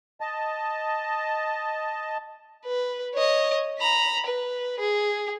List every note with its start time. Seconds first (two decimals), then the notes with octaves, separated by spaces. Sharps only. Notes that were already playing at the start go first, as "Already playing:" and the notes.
0.21 D#5 A5
2.66 B4
3.14 C#5 D#5
3.79 A#5 B5
4.26 B4
4.80 G#4